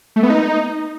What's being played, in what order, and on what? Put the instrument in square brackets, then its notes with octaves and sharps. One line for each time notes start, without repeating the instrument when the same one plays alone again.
[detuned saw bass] A3
B3
D#4